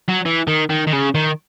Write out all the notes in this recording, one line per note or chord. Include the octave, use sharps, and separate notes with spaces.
F#3
E3
D#3
D#3
D#3
C#3
D#3